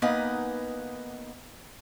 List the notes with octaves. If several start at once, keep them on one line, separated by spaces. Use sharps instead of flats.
A#3 B3 D#4 B4 F#5 G#5